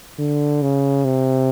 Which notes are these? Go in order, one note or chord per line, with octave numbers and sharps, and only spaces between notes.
D3
C#3
C3